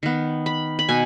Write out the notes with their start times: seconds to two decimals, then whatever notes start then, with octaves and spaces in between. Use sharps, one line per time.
0.03 D#3 B3
0.46 B5
0.79 B5
0.89 B2 G#5